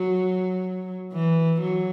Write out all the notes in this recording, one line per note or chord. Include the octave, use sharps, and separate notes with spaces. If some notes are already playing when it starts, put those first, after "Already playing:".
Already playing: F#3
E3
F#3